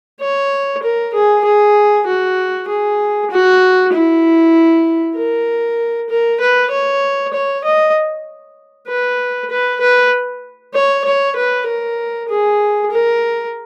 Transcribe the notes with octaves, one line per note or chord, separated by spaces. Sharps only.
C#5
A#4
G#4
G#4
F#4
G#4
F#4
E4
A#4
A#4
B4
C#5
C#5
D#5
B4
B4
B4
C#5
C#5
B4
A#4
G#4
A#4